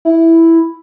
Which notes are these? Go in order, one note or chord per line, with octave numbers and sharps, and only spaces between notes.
E4